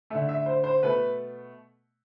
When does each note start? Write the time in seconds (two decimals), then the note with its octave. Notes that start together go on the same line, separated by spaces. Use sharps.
0.10 D3 A3 E5
0.29 E5
0.46 C5
0.64 C5
0.82 B2 A3 B4